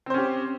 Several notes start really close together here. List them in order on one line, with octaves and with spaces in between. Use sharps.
C4 C5 C#4 G4